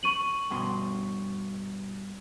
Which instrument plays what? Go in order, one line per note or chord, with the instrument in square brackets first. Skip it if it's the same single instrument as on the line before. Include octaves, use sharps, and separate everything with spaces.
[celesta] C#6 D#7 F#7
[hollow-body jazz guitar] G2 B2 C6